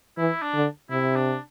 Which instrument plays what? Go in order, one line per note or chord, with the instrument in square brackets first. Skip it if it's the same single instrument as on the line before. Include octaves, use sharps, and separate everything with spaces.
[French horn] E3 [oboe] E4
[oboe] D4
[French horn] D3
[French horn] C3 [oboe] E4
[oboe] D4